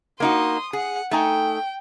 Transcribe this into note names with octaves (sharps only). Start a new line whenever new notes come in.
A#3 D#4 F#4 C6 D#6
G#4 F#5
A3 D#4 G5 G#5